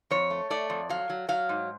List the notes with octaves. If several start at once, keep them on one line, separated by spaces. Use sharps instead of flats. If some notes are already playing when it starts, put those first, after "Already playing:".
F2 C#5
A3
A3 D5
F2
F#3 F5
F#3
F#3 F5
G#2